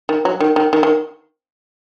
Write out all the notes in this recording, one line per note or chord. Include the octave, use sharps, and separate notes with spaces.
D#3
F#3
D#3
D#3
D#3
D#3